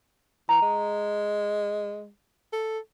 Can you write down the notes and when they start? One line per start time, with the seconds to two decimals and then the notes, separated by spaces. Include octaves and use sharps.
0.49 E3 A#5
0.62 G#3
2.53 A4